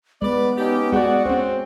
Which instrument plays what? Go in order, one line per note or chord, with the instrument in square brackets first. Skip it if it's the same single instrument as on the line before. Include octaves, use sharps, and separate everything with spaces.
[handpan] G#3 [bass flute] B3 [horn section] B4 D5
[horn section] C#4 D#4 G4
[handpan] G#3 G#4 [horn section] F#4 [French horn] D5
[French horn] C4 [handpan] C#4 C5